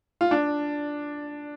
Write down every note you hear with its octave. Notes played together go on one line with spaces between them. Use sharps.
F4
D4